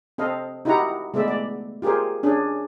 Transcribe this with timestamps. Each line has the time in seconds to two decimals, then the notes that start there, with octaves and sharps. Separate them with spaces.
0.18 C4 A4 D#5 F5
0.65 D#4 E4 F#4 G4 F#5 A#5
1.14 G#3 A3 B3 D5 E5
1.28 D5
1.82 F4 G4 G#4 A#4 C5
2.23 C#4 D4 G#4